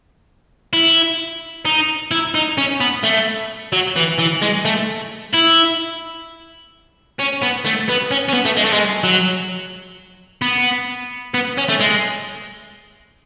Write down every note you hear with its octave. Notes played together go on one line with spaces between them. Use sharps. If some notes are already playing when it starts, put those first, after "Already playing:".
E4
D#4
E4
D#4
C#4
B3
A3
F#3
E3
E3
G#3
A3
E4
C#4
B3
A3
B3
C#4
C#4
B3
A3
G#3
A3
G#3
F#3
B3
B3
C#4
A3
G#3